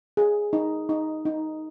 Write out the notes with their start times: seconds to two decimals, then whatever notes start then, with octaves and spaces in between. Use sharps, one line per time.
0.17 G#4
0.53 D#4
0.89 D#4
1.25 D#4